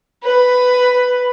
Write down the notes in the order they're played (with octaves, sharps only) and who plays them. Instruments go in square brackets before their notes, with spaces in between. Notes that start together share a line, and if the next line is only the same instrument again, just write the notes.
[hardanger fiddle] B4